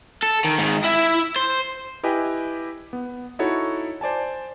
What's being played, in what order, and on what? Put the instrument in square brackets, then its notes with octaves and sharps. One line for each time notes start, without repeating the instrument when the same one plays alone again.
[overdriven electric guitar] A4
D#3
G#2 D#3
E4 E5
C5
[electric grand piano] E4 G4 B4 D#5 G5 G#5
B3
D#4 E4 F#4 A4 C#5
C5 D5 G#5 A5